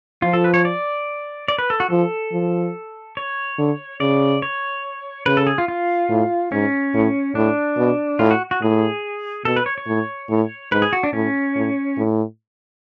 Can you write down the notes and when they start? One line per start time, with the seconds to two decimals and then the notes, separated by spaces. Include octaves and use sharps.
0.22 F3 F4
0.33 A4
0.44 B4
0.54 C#5
0.65 D5
1.48 D5
1.58 B4
1.70 A4
1.80 F#4
1.90 F3 A4
2.33 F3
3.17 C#5
3.58 D3
4.00 C#3 D5
4.42 C#5
5.26 C#3 B4
5.37 A4
5.47 G#4
5.58 F4
5.68 F4
6.10 A2
6.52 G#2 C#4
6.94 A2
7.35 A2 D4
7.77 B2
8.19 A2 F4
8.31 F#4
8.51 F#4
8.62 A2 G#4
9.45 B2 A4
9.56 B4
9.66 C#5
9.78 C#5
9.87 A2
10.30 A2
10.71 G#2 B4
10.82 G#4
10.93 F#4
11.03 D4
11.13 A2 C#4
11.55 A2
11.97 A2